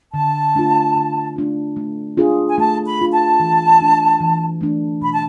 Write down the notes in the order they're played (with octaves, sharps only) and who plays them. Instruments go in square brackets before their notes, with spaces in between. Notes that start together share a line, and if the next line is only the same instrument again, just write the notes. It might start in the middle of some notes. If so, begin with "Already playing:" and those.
[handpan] D3 [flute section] A5
[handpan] A3 D4 F4
D3
A3 D4 F4
A3
D4 F4 G#4
[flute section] G#5
[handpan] A3 [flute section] A5
[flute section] B5
[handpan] D4 F4 G#4
[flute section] A5
[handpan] E3
A3 D4
E3
A3 D4
[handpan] B2 [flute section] B5
[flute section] A5